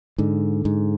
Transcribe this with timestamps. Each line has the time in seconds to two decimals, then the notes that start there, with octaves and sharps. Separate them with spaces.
0.18 G#2 D3
0.65 G#2